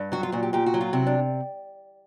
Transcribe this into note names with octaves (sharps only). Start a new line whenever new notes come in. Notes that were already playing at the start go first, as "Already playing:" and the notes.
Already playing: G2
F#3 F#4
F4
A#2 F#4
G4
A#2 G4
F#4
F#3
F4
C3 E4
D4